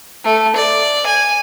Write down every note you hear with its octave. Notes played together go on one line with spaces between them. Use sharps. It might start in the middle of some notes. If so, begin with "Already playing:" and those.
A3
D5
G#5